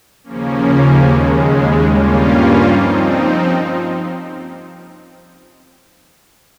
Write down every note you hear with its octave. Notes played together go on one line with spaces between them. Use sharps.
D#2 C#3 F3 A#3 C#4
D#2 C#3 G#3
G2 G3 A#3 C#4 F4
F3 C4 D#4